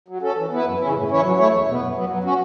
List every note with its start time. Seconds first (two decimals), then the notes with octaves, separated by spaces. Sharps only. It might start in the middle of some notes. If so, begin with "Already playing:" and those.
0.08 F#3
0.22 C#4 A4
0.36 E3
0.51 B3 E4 B4
0.65 F#2
0.79 C#3 E3 C#4 E4
0.94 A2
1.09 E3 C#4 E4 C#5
1.22 F#3
1.38 A3 E4 C#5
1.52 E2
1.66 B2 B3
1.80 F#2
1.95 F#3 B3
2.09 F#3
2.24 C#4 F#4